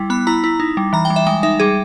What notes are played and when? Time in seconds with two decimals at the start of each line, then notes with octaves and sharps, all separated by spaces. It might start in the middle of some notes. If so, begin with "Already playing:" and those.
Already playing: G3 E4
0.10 B3 B5
0.27 E4 A#5
0.44 E4
0.60 D#4
0.77 G3
0.93 E3 A#5
1.05 G5
1.10 G3
1.16 E5
1.26 G#3 G5
1.43 D#4 E5
1.60 G3 G#4